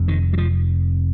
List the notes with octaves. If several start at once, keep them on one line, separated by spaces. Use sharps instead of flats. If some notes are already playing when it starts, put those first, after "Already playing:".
Already playing: F1 F2 C3
D#3
F#3
F3